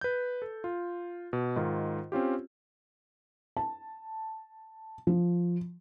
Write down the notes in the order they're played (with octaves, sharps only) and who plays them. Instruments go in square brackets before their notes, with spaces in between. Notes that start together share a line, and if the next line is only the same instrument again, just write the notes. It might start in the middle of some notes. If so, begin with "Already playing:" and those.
[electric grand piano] B4 G6
A4
F4
B2
G#2 D#3 F4
C4 C#4 F4 G4
[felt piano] A5
F3